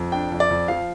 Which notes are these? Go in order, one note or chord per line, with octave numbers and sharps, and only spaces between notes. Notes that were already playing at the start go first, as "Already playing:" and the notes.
Already playing: F2
D4 G5
F2
D5
F2
F3 F5